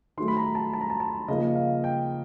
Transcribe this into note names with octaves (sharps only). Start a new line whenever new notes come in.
D#3 F#3 A3 C6
B5
A#5
A5
A5
A#5
A5
A5
C#3 F3 A#3 D#4 D#5
F5
G5